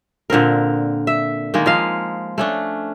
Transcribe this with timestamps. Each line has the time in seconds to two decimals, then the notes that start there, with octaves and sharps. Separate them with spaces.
0.30 A#2 D3 C4 A#4
1.07 E5
1.54 D#3 G#3 A#3
1.66 F3 D#5 F5
2.38 A3 C#4 D4